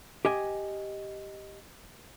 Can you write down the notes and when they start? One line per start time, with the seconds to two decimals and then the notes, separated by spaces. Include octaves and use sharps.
0.25 G4 D#5 G#5